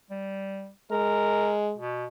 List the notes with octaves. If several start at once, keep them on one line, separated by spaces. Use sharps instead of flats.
G3
G#3 A#4
B2